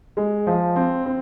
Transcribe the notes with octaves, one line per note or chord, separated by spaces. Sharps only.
G#3
F3
C4
C4